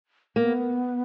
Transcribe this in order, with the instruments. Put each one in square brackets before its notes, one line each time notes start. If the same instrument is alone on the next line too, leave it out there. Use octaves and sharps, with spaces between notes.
[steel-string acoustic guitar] A#3 [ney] B3